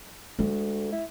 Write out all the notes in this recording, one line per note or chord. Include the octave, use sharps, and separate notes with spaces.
D2 G#3
E4